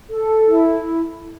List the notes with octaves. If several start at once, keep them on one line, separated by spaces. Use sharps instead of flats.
A4
E4